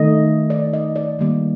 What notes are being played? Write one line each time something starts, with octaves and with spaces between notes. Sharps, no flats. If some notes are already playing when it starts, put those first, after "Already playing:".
Already playing: D#3 A3 D#5
D5
D#5
D5
D#3 G3 A#3